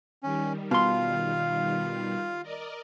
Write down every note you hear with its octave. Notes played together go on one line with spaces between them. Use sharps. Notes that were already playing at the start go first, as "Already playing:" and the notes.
D#3 G3 C#4
B2 F4 F5 C6
A#4 D5 D#5